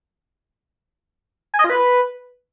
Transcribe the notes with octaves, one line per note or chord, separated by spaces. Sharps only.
G#5
D#5
F4
B4